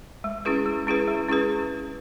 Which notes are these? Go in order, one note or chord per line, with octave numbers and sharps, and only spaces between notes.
G#3
C#4 E4 G#4 B4
G#3
C#4 E4 G#4 B4
G#3
C#4 E4 G#4 B4